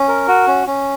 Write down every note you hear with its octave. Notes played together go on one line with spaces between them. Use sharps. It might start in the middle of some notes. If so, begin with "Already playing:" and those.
Already playing: C#4
A#4
F#4
C#4
C#4